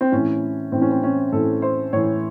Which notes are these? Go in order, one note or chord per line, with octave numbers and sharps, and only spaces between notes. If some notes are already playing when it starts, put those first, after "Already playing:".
C4
A2 E3 C#4
A2 E3 C4
C#4
C4
C#4
A2 E3 A4
C5
A2 E3 C#5